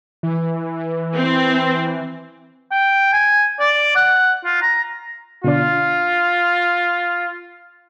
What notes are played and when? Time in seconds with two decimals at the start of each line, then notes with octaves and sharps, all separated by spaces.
0.23 E3
1.16 C4
2.71 G5
3.13 G#5
3.60 D5
3.96 F#5
4.45 F4
4.62 A#5
5.44 B2 D3 D4 F4